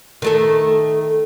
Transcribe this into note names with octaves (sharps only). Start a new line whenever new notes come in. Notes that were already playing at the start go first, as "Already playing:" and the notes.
D#3 A3 A4